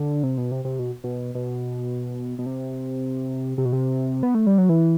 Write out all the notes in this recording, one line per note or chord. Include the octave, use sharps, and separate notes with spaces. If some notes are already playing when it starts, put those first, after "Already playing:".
Already playing: D3
C3
B2
C3
C3
B2
B2
B2
B2
C3
C3
B2
C3
B3
A3
G3
F#3
E3